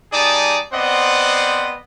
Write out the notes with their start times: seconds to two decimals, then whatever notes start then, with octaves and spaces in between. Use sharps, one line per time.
0.13 G3 D#4 G#4 D5 A5 D#6
0.73 B3 C4 C5 D5 D#5 F#5